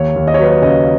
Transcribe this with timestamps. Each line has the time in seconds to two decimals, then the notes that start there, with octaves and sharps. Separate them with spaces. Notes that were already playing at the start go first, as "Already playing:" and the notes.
Already playing: D#2 C#5
0.16 D#2
0.27 D#5
0.34 C#5
0.39 F#3 B4
0.49 C#5
0.62 C#3 D#5